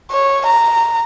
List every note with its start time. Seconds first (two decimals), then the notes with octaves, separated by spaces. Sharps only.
0.11 C#5
0.47 A#5